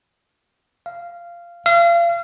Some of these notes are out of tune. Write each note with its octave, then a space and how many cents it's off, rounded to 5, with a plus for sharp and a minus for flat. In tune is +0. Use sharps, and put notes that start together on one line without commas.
F5 -15
F5 -35